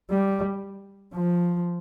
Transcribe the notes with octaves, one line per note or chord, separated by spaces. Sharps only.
G3
F3